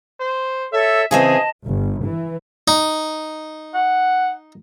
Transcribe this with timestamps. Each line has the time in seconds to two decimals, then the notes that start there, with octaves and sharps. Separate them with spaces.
0.20 C5
0.73 A4 C#5 E5
1.11 C#3 E3 C4 G#4 D#5 A5
1.66 G1
2.05 E3
2.68 D#4
3.75 F#5